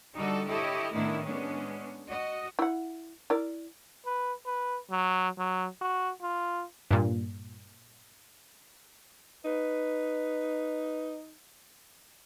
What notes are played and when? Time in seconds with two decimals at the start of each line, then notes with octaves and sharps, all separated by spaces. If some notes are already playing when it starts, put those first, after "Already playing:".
0.15 D3 G3 D#4 F#4 A4 D5
0.49 E4 G4 A4 C#5 D#5
0.94 A2 D#3 A3 B3 D4 E4
1.25 G#3 B3 C#4 D4
2.08 F#4 D#5
2.59 E4 F#5
3.30 E4 A#4 D5
4.06 B4
4.46 B4
4.91 F#3
5.38 F#3
5.81 F#4
6.22 F4
6.91 G2 A#2
9.45 D#4 B4